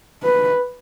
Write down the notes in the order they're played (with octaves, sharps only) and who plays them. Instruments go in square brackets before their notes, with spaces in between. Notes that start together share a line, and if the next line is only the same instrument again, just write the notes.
[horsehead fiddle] B4